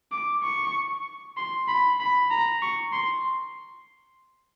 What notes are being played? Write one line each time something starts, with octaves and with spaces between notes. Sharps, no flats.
D6
C#6
C6
B5
B5
A#5
C#6
C6